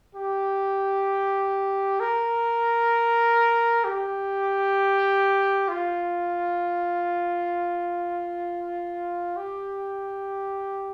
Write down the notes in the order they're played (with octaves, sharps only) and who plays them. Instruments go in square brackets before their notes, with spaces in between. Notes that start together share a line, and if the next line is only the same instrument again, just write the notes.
[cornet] G4
A#4
G4
F4
G4